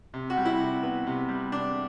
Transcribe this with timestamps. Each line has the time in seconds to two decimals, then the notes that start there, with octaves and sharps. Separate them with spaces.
0.14 C3
0.30 F#4
0.37 G3
0.45 E4
0.60 C3
0.83 B3
1.07 C3
1.29 G3
1.52 C3 D4